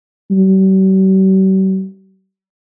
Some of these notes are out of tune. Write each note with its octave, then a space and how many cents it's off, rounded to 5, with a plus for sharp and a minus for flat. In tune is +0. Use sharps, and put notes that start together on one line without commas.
G3 -45